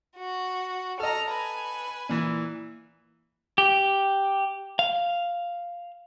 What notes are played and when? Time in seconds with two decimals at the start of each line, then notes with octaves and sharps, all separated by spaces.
0.17 F#4
1.00 A4 D#5 A#5 F6
1.30 B4 G#5
2.09 A#2 E3
3.58 G4
4.79 F5